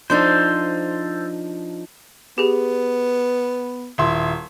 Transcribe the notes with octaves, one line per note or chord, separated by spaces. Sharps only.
F3 D4 D#4 A4 C5
B3 G4 G#4
D#1 E4 C6